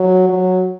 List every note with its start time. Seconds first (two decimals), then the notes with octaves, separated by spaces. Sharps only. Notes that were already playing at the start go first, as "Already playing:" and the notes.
Already playing: F#3
0.29 F#3